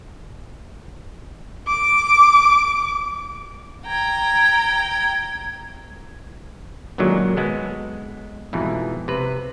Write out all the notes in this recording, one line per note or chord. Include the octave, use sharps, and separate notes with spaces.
D6
G5 A#5 G#6
F#2 A#2 D3 D#3 F#3 G#3
G#3 B3 A4
F2 G#2 B2 E3
C3 B4